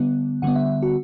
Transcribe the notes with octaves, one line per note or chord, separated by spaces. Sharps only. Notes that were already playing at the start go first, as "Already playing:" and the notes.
Already playing: D3 G3 B3
D3 G3 B3 F#5
E5
F#4